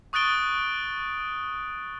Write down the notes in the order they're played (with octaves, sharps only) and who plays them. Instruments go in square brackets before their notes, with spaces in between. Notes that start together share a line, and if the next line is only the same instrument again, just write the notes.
[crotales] C#6 D#6 F#6 A6 D7 G7